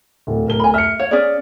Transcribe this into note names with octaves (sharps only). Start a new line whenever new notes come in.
D1
D1 A#4 G7
G#5 B5
E5 F6 C#7
C#5 F5
C#4 G#4 D5